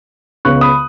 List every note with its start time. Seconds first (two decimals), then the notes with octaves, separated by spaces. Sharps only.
0.45 C#2 C#3 B3 C#6 F#6
0.61 B5 D#6